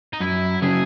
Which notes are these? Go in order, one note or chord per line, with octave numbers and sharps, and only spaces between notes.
D#4
F#2 E4
C#3 F#3 G#4